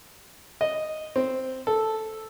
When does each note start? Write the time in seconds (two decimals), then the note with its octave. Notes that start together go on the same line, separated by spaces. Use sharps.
0.61 D#5
1.16 C4
1.67 A4